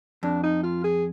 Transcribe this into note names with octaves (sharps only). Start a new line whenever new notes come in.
F2 D4
D#4
F4
G#4